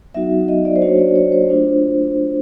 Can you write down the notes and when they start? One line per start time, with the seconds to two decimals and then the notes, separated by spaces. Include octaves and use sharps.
0.14 F#3 B3 D#4 F#4 E5
0.48 D#5
0.65 D5
0.76 C5
0.82 F#3 A#3 D4 F#4 C#5
0.99 D5
1.15 C#5
1.32 C5
1.49 A3 D4 F4